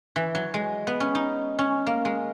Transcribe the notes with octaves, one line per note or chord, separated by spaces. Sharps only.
E3
F#3
G#3
B3
C#4
D#4
C#4
A#3
G#3